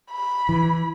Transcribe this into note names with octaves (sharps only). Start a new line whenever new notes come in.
B5
E3